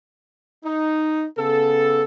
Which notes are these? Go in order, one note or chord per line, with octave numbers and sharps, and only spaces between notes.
D#4
C#3 B3 A4